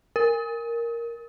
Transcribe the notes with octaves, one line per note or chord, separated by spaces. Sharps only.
A#4